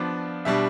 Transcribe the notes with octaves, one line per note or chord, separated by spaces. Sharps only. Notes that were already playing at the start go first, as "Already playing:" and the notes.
Already playing: F3 B3 D4 D5
B2 G3 D4 E5